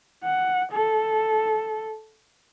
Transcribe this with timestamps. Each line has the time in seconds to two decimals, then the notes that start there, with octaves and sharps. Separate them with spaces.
0.24 F#5
0.72 A4